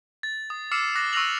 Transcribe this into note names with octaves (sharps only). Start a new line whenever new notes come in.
A6
D#6
D6 E6 F6 C7 C#7 E7
D6 F#6 A#6
C#6 E6 F#6 A#6 F7 F#7